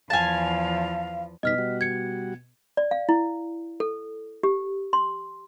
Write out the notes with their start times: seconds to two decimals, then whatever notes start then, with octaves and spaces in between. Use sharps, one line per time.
0.10 E2 F3 F5 G#5 A5
1.43 B2 G3 D#4 D#5 F6 B6
1.58 G3 F#4
1.81 G#6 C#7
2.77 D5
2.91 F5
3.09 E4
3.80 A4
4.43 G4
4.93 C6